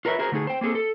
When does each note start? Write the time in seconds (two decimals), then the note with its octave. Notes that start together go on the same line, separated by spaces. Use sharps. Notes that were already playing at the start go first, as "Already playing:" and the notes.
0.05 F4 A#4 B4 C#5 E5
0.19 F#4 G#4 A#4 C5
0.32 D3 A3 D#4 G#4
0.47 C5 G5
0.61 A#3 C4 G#4 A4
0.75 A4